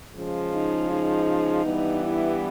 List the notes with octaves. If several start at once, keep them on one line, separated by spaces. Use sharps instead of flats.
C#3 F3 G#3
D#4
D#4
G2 E3 G3 B3
E4